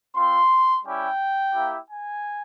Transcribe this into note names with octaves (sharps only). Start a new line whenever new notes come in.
C4 F4 C6
G3 C#4 E4 G4 G5
A#3 E4 G4
G#5